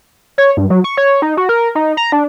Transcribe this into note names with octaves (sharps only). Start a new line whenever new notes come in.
C#5
G2
F#3
C#6
C#5
D#4
F#4
A#4
D#4
A#5
D4